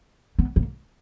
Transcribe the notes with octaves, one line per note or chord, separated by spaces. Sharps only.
B3
A#3